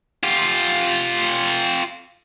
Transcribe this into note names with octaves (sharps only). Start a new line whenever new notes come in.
F4 G4